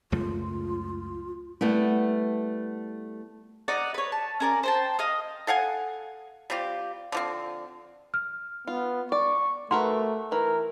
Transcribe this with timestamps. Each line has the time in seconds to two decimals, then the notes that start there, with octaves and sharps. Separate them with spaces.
0.12 C#2 F#2 A3 F4
1.61 G3 A3 B3 E4
3.68 D#4 D5 F#5
3.94 B4 C#5
4.12 A5
4.40 C#4 A#4 D5
4.63 C5 G5 A5
4.99 D#5 F5 D#6
5.47 A4 F5 F#5 G#5
6.50 G3 C4 F4 G4
7.12 D3 F3 C4
8.14 F6
8.67 B3 F4
9.12 D5 C#6
9.71 A3 F#4 A#4 B4 C6
10.32 E3 A#4